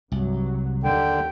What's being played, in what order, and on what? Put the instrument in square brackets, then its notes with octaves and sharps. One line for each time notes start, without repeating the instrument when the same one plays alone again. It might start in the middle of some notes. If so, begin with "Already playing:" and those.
[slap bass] C2 [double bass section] G2 F#3
[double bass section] D#2 [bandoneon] D3 [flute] G5